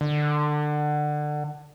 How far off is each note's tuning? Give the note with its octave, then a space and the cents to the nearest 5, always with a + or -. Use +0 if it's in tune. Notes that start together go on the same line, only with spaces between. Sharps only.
D3 +25